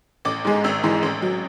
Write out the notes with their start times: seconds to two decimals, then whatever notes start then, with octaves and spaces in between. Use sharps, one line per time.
0.25 A1 D6
0.45 G#2 G#3
0.64 G#1 E6
0.83 G#2 E3 G#3
1.03 A1
1.22 F#3